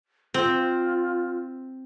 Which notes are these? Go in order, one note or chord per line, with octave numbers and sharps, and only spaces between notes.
C4 F4